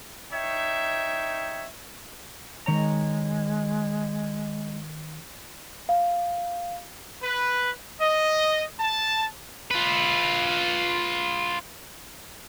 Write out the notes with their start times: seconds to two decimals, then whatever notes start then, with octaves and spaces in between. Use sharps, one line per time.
0.32 D#4 C#5 E5 G5
2.66 D#3 G#3 C#5 A#5
5.89 F5
7.22 B4
8.01 D#5
8.79 A5
9.71 F4 B4